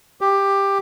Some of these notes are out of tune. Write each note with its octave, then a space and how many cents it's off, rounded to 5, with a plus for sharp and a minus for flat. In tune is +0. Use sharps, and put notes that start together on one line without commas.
G4 +10